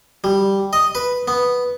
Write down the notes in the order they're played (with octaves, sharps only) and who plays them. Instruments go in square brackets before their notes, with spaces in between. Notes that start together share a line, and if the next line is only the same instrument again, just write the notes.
[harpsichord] G3
D#5
B4
B3